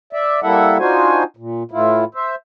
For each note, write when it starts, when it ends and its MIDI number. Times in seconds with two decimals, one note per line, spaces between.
0.13 0.40 74
0.13 0.40 76
0.43 0.78 55
0.43 0.78 58
0.43 0.78 64
0.43 0.78 69
0.43 0.78 76
0.43 0.78 78
0.79 1.23 62
0.79 1.23 63
0.79 1.23 65
0.79 1.23 66
0.79 1.23 72
0.79 1.23 80
1.37 1.63 46
1.71 2.05 45
1.71 2.05 52
1.71 2.05 64
1.71 2.05 65
2.15 2.35 72
2.15 2.35 76